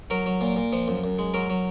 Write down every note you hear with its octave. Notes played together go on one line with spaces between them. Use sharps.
F#3 A#4
F#3
A#2
A#2
F3
F#2
F#2
G#3
F#3 A#4
F#3